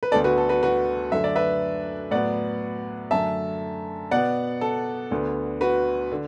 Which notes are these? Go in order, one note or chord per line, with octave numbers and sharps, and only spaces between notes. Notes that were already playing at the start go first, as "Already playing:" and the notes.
B4
D2 D3 B3 A4 D5
F#4 B4
A4
F#4 B4
F#4 B4
F#2 D3 A3 E5
D5
B4 E5
A2 F#3 B3 D5 F#5
F#2 D3 A3 E5 A5
B2 B3 D5 F#5
A4
D2 D3 B3
F#4 B4
D3